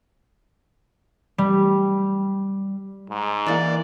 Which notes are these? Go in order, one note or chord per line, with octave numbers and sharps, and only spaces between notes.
G3
G#2
E3 A#3 D5